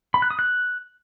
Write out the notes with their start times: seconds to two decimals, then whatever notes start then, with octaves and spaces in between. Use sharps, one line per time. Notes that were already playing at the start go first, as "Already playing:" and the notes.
0.14 B5
0.22 F#6
0.31 D#6
0.39 F#6